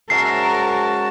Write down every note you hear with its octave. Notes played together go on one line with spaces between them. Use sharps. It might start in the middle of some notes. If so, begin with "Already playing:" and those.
G#2 C#4 F#4 A#4 E5 A5 C7